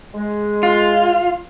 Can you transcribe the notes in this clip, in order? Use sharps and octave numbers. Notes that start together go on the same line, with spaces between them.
G#3
F4